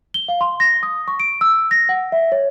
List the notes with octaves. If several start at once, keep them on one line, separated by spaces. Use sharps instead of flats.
G7
F5
C6
A#6
D#6
C#6
D7
E6
A#6
F#5
E5
C#5